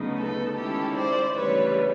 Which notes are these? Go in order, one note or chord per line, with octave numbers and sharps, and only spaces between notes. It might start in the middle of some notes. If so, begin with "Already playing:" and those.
Already playing: D2 C#3 F#3 B3 D#4
A4 B4
D#3 G#3 C#4 E4 G4 A4
C5 D5
D2 C#3 E3 G3 B4 C#5